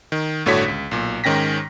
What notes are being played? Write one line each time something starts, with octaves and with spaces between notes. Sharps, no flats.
D#3
G1 A2 D3 F#4 C#5 B6
C#2
B1 A#2
G#2 D#3 C#4 G5 A#6 B6